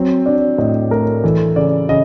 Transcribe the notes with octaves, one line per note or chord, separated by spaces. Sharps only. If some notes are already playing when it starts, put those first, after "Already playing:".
Already playing: F#3 C4
D4 D5
A2 D#5
A3 A#4
E3 A4
C#3 D5
C#3 D#5